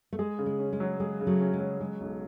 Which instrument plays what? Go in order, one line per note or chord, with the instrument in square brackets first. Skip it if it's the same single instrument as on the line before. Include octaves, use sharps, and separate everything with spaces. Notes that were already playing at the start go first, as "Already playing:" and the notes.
[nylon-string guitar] A3
[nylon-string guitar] G#3 [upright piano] G#4
[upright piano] C#3
[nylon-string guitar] G#3
[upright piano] C#4
[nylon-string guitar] G#3
[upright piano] F#3
[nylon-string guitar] G#3 [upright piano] G#4
[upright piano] C#3
[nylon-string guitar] F#3 A3
[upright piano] C#4
[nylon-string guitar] G#3
[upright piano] F#3
[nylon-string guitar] G#3 [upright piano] C#4
[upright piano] B1